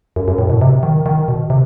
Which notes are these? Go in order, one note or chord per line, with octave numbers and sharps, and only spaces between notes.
F#2
F#2
A2
B2
C3
D#3
D#3
B2
C3